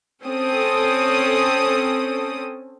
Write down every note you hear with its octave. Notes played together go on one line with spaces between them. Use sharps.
C4 C#4 A4 D#6